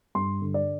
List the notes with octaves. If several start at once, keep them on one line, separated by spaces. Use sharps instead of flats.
G2 C6
D3
D5